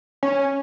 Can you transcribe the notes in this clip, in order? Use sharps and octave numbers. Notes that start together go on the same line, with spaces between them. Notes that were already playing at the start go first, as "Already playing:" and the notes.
C#4